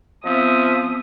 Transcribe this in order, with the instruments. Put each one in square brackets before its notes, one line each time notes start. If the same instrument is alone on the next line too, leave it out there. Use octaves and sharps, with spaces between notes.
[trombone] F3 [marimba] B3 C4 [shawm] E5 [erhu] D#6